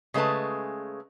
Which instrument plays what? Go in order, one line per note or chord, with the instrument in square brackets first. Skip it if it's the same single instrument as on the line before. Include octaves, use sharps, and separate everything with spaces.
[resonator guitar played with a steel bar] C#3 G#3 A3 B4 A5